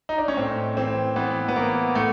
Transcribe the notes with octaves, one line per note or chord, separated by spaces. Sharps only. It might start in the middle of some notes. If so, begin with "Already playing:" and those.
D#4
D4
C#4
A2 C4
E3 C4
E3 B3
B3
E3 A#3
A2 A3